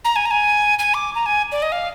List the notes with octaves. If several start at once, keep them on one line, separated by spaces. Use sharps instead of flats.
A#5
G#5
A#5
G#5
G#5
D6
A#5
G#5
D5
D#5
F5